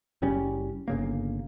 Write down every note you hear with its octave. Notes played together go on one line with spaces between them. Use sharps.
F#1 C#3 G3 C#4
G1 C#3 A#3